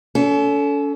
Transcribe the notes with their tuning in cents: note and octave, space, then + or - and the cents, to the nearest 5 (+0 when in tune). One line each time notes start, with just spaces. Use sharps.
C#4 +40 A4 +0